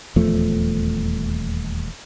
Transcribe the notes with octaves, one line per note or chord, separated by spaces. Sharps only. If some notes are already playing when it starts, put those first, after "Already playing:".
D#1 E2 F3 A3